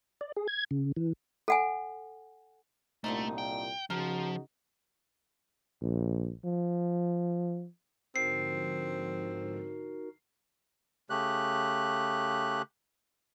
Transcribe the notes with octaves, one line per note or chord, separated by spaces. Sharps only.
D5
G#4
G#6
C#3
E3
A4 F#5 G#5
C2 A#2 D3 A3 C4 D#4
G5
C#3 F3 D#4 F#4 A#4
A#1
F3
G#2 D3 F3 C4 D#4 F#4 A#4 C7
C#3 A3 G4 F#6